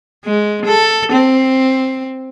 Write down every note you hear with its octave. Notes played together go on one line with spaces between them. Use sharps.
G#3
A4
C4